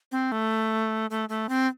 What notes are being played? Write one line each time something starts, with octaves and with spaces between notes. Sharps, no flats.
C4
A3
A3
A3
C4